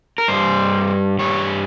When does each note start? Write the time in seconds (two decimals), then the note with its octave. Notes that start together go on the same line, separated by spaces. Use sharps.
0.18 A#4
0.28 G2 G3 C5
1.19 G2 G3 C#5